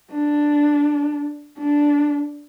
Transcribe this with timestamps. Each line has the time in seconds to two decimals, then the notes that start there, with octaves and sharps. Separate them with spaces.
0.12 D4
1.58 D4